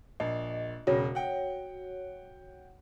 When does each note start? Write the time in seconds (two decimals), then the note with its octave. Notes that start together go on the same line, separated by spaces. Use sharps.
0.20 A#1 D#5
0.87 E1 C#3 F#4 C#5
1.15 F#5 G5